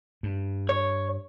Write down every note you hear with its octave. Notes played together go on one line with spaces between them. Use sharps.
G2
C#5